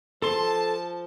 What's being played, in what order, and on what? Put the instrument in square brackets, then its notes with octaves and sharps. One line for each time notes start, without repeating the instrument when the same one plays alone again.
[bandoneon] F3 [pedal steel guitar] A4 C6 [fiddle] A5